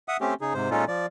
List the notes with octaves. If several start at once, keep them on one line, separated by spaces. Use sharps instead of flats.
E5 F#5 D#6
A3 C4 C#4 G4
C#3 D#4 G#4
G#2 C3 C5
A#2 G#3 C#4 D#4 F4 A4
F3 D5